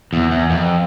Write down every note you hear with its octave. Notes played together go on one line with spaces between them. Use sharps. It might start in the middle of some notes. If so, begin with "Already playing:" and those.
E2
E2
F2